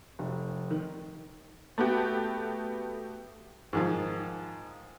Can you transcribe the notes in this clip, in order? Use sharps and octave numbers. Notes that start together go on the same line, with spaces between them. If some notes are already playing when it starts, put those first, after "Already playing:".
F1
D#3
A3 B3 F#4 G4
G#2 D#3 F3